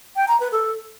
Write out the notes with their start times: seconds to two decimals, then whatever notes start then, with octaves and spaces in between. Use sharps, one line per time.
0.16 G5
0.28 A#5
0.40 B4
0.52 A4